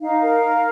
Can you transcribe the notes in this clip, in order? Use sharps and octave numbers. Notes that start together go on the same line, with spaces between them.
D#4 F5
A#4